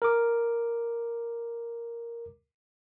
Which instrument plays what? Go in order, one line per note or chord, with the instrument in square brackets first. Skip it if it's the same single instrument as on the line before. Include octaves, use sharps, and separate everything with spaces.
[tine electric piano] A#4 D6